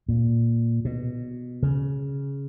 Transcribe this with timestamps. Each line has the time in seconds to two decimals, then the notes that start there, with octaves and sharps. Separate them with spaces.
0.08 A#2
0.85 B2
1.63 C#3